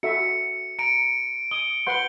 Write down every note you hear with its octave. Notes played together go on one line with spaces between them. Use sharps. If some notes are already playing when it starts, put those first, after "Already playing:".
F#4 A4 E5 C#7
A#5 C#7 D7
D#6 G7
B4 F#5 C6 G6 G7